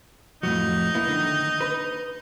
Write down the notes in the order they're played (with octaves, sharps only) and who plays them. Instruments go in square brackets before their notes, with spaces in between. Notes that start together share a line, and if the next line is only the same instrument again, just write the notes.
[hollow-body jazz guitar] F2 A2 F#3 [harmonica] D#4
[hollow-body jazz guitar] A#3 B3 E4
D3 D#3
B4